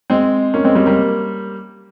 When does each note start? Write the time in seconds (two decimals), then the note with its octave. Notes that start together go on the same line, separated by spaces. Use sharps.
0.10 G#3 C4
0.54 A#3 C#4
0.65 G#3 C4
0.75 G3 A#3
0.86 G3 A#3